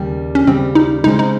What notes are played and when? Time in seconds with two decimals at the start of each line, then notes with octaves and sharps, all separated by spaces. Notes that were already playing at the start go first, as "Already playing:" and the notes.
Already playing: D#2 C#3 G3
0.35 C#4
0.47 D#2 C#3 G3 C4
0.75 D#4
1.04 C#3 G#3 C4 D#4
1.19 D#4